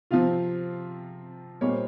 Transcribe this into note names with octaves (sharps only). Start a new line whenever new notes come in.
C3 F3 C4 F4 F5
A#2 G3 A#3 D#4 C#5
C5